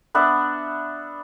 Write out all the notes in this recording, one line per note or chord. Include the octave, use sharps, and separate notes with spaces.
B3 D4 E5 F#5